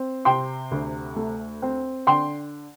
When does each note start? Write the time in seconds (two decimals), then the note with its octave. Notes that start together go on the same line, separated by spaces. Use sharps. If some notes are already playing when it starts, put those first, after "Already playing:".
Already playing: C4
0.25 C3 G5 C6
0.71 D2
1.16 A3
1.62 C4
2.07 D3 G5 C6